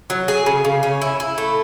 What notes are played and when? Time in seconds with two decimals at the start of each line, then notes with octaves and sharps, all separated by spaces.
0.10 F#3
0.28 G#4
0.46 C#3
0.65 C#3
0.83 C#4
1.02 E4
1.20 E4
1.38 A3